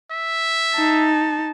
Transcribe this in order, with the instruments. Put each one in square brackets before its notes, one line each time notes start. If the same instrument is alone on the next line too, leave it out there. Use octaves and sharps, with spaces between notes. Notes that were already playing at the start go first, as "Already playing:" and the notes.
[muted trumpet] E5
[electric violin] D#4 A5